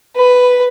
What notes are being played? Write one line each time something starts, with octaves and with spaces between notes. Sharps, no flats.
B4